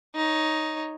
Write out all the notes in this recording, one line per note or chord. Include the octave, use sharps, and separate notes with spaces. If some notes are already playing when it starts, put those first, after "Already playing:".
D#4 C#5